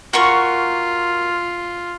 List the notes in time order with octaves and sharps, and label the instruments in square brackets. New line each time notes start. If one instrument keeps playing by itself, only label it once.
[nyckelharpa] F4 [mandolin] F#4 A#4 C#6